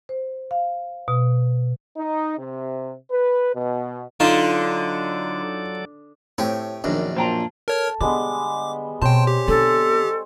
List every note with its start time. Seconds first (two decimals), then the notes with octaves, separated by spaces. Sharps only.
0.09 C5
0.51 F5
1.08 B2
1.97 D#4
2.39 C3
3.11 B4
3.55 B2
4.20 D3 F#3 D#4 F4 A4 D5 A5 C6
6.38 A2 A3 C4 G4 C#5
6.84 A#1 F#2 B2 D#3 D4
7.17 A#2 D4 F4 C5 G5 A#5
7.68 A4 A#4 C#5 F6
8.01 D3 G3 G#3 B3 D6
9.02 B2 C4 C5 C#5 G5 A5
9.27 G4
9.48 D3 B3 A4